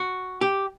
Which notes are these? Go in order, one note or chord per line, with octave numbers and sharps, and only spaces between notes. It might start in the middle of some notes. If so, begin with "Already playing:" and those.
Already playing: F#4
G4